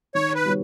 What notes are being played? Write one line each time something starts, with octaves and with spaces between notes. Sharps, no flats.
D#3 C#5
B4
G3 B3 G4 C#5